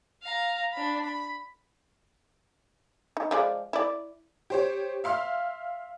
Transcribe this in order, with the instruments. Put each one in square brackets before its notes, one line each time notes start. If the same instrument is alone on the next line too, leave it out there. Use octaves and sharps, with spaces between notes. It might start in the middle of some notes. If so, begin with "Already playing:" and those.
[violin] F5 A#5
D4 B5
B5
[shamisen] D#4
F3 G#3 D5
E4 D5
[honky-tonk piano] G4 C5 C#5
E5 F5 C6 F6